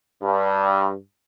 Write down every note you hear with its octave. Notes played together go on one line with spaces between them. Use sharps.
G2